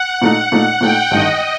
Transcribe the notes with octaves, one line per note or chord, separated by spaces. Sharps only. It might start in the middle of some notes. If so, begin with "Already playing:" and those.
Already playing: F#5
A#2 A3 D#4
A#2 A3 D#4
A#2 A3 D#4 G5
A1 G2 D#3 D#5